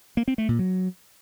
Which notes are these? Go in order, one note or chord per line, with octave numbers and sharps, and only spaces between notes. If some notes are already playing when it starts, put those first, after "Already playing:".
A#3
C4
A3
A#2
F#3